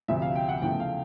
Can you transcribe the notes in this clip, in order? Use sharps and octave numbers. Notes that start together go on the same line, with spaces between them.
D2 C3 F3 E5
F5
G5
F#5
E2 C#3 F3 A3 G5
F5